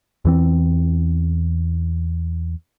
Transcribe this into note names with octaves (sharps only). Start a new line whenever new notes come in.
E2 E3 C4